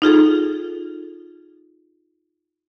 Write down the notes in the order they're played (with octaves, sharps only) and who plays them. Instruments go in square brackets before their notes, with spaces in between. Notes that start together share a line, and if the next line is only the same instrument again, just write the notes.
[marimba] D#4 F4 G#4 A4